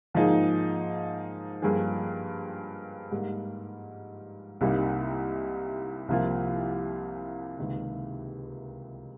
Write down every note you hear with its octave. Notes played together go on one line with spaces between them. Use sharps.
G#2 F3 A#3 D#4 G#4
G2 F3 A#3 F4 G#4
G#2 G3 A#3
C2 C3 G3 A#3 D#4
C2 C3 F3 A#3 F4
C#2 C3 D#3 A#3